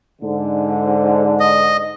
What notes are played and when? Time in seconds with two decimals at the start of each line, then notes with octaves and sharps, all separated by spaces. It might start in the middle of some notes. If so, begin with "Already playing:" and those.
0.22 G#2 D3
1.40 D#5